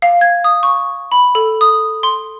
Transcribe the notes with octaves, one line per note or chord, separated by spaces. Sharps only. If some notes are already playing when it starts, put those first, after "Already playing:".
F5
G#6
D#6
C#6
B5
A4
D#6
C6